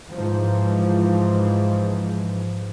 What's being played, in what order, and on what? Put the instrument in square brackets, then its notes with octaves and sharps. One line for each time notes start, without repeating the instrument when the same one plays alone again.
[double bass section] G#2 E3 F3